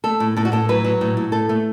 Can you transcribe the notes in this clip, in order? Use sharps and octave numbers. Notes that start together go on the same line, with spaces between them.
A3 A4
A2
A2 A4
F#4
A2 A4
F#3 B4
F#3
A2
A2
A3 A4
A3